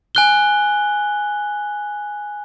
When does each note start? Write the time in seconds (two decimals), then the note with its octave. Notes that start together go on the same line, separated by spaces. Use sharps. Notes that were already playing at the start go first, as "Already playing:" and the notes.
0.15 G#5 F#6 G7